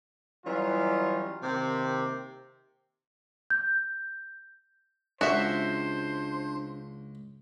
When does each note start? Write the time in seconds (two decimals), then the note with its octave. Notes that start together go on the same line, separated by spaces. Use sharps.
0.45 E3 F#3 G3 C#4 D#4 F4
1.42 C3 D#3 A#3 C4 G4
3.50 G6
5.21 C#2 D4 F#4 C5 E5